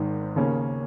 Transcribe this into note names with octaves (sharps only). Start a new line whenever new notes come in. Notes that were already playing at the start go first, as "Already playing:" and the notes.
Already playing: G#1 G#2 D#3
D#2 C#3 A#3 C#4